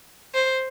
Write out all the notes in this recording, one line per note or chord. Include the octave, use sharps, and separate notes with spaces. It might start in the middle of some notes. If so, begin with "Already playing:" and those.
C5